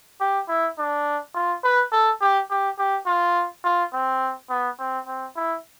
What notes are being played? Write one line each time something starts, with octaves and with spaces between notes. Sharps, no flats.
G4
E4
D4
F4
B4
A4
G4
G4
G4
F4
F4
C4
B3
C4
C4
E4